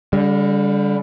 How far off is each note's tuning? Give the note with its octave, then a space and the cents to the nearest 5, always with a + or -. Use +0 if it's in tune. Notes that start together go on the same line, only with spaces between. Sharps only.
D3 -30 G3 +25